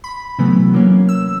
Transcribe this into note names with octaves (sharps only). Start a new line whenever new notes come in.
B5
C3 E3 F#3 A3 B3
F#3 A#3 C#4
E6